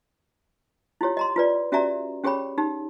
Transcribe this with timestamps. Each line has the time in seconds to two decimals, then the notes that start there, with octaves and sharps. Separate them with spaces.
1.01 E4 F4 G4 C#5
1.17 D#5 A#5 C6
1.36 F4 B4 D5
1.72 C#4 F#4 G4 D5 E5 A#5
2.24 C#4 G4 G#4 C#5 G5 B5
2.58 D#4 G4